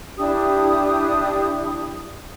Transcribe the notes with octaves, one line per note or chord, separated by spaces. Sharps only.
D4 E4 G4 D#6